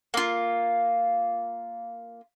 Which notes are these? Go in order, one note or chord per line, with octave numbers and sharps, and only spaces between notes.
A#3 F4